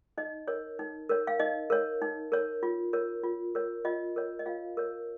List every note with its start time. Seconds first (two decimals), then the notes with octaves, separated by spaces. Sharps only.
0.18 D#4 D#5
0.48 A#4 C#5
0.79 D#4
1.09 A#4 C#5
1.27 F5
1.40 D#4 D#5
1.70 A#4 C#5
2.02 D#4
2.32 A#4 C#5
2.63 F4
2.93 A#4 C#5
3.24 F4
3.55 A#4 C#5
3.85 F4 D#5
4.16 A#4 C#5
4.39 D#5
4.46 F4 F5
4.77 A#4 C#5